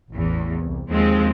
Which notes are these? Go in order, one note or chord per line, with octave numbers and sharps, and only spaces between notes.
A1 E2
C2
D#2 F3 G#3 C4